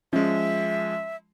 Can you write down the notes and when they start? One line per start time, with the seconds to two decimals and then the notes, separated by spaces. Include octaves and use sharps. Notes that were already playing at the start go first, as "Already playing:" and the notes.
0.13 F3 G#3 C#4 E5